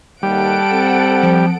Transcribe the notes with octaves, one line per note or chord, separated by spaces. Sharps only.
D#2 G3 A4 F#5 D7
C4
F3